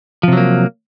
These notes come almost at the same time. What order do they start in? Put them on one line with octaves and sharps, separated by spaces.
F3 C3 F#3 A#3